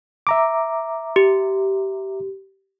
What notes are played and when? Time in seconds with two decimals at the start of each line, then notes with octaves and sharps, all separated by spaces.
0.27 E5 A#5 D6
1.16 G4